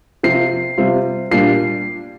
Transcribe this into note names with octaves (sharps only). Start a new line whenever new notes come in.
C3 F3 C4 F4 C7
C3 G3 C4 F4
A#2 G3 D4 F4 C7